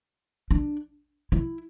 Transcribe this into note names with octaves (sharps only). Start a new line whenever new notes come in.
D4
E4